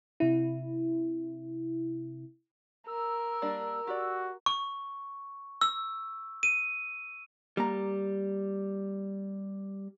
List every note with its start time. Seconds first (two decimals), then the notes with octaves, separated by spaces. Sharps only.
0.20 C3 E4
2.88 A#4 E6
3.42 G3 A#3 D4
3.87 F#4 G4 D5
4.46 C#6
5.61 E6
6.43 D#7
7.57 G3 A#3 A#5